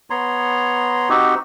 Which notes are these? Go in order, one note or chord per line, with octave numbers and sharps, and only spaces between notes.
B3 C#5 A#5 C6
C4 D#4 F#4 G4